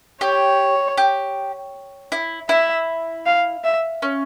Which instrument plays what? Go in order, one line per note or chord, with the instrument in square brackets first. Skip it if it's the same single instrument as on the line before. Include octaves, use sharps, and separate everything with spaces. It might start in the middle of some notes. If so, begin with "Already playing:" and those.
[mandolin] G4 [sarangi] C#5
[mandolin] G4
E4
[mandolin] E4 [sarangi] E5
[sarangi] F5
E5
[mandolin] C#4